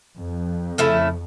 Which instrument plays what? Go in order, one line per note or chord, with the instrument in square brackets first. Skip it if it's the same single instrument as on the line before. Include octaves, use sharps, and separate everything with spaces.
[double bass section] F2
[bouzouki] C#3 A3 E4